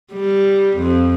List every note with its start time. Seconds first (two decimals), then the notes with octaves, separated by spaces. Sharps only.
0.13 G3
0.78 F2